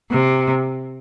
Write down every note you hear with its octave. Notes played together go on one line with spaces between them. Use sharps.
C3